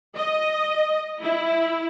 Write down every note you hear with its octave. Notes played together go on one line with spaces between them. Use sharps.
D#5
E4